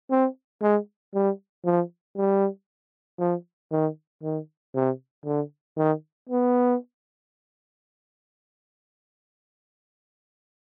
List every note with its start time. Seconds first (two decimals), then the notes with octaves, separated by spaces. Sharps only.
0.11 C4
0.62 G#3
1.15 G3
1.65 F3
2.17 G3
3.19 F3
3.72 D#3
4.23 D#3
4.75 C3
5.26 D3
5.77 D#3
6.30 B3